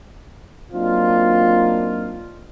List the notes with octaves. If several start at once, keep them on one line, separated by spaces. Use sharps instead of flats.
F#3 A#3 C4 D4 D#4 F4